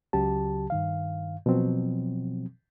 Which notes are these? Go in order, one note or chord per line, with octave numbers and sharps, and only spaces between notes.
C#2 C#3 F#3 G4 A5
G2 D#3 F5
B2 F3 F#3 C4